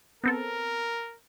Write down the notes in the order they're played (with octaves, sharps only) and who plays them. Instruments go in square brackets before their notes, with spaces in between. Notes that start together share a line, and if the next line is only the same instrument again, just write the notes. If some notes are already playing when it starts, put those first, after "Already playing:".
[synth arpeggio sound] B3 C4 A4 [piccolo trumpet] A#4